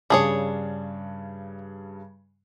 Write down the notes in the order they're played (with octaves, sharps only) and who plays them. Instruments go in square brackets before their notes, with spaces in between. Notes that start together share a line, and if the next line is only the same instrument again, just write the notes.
[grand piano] G2 C#3 [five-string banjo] D4 G#4 C#5